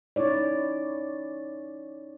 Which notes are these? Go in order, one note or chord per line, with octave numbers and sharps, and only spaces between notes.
C#4 D#4 E4 C#5 D5